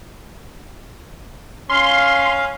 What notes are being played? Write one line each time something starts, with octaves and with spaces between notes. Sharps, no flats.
C#4 F5 C6